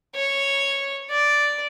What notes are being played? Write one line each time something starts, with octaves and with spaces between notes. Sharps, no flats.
C#5
D5